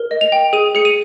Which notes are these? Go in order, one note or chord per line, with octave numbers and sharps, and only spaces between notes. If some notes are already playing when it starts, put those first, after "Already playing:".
Already playing: A#4
D#5
F7
G5
G#4 D#7
G#4 C#7
D#7